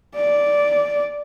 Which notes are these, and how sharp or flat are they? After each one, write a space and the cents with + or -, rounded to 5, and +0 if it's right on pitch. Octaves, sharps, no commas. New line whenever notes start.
D5 -10